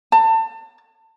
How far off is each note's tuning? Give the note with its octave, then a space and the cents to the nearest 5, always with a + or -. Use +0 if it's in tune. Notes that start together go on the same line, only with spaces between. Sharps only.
A5 +30